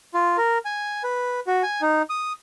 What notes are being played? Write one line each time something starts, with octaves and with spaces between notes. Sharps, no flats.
F4
A#4
G#5
B4
F#4
G#5
D#4
D#6